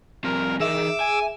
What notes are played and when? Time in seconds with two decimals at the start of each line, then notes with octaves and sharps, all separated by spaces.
0.24 F3 G3 C4 A#4
0.60 E3 D#4 G#4 A#4 E5 D6 E6
1.00 G#5